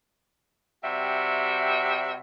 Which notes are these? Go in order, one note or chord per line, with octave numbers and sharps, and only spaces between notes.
C3 G3 F#4 E5